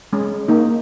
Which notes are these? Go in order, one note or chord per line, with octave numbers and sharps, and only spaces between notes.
G#3 C#4
A#3 D#4